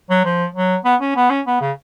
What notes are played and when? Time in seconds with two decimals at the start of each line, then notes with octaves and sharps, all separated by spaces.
0.10 F#3
0.25 F3
0.55 F#3
0.85 B3
1.01 C#4
1.16 B3
1.30 C#4
1.46 B3
1.61 C#3